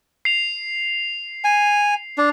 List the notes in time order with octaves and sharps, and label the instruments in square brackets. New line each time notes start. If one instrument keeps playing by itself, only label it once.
[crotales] C7 F7
[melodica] G#5
D4